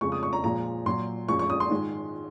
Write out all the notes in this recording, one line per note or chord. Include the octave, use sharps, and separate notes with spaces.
F2 C#3 F3 G#3 C#6
D#6
C#6
A#5
A#2 F3 G#3 A#5
A#2 F#3 C6
F#2 F3 G#3 C#6
C#6
D#6
C6
G#2 D#3 G#3